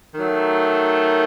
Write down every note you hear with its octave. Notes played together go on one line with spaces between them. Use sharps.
D#3 F#3 A3